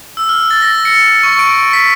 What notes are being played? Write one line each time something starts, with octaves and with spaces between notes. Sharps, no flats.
E6
F6
A6
A#6
C#7
C#6
D7
B6